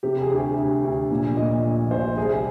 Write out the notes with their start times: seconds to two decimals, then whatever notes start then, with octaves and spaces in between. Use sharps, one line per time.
0.03 C3 G4
0.21 G#4
0.30 D2
0.39 G4
0.57 D2
0.83 D2
1.10 A#2
1.37 A#2 D#5
1.64 A#1 D#5
1.91 A#1 C5
2.17 C2 G#4
2.31 G4